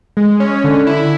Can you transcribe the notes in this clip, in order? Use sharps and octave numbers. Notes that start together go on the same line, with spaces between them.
G#3
C#4
D3
E4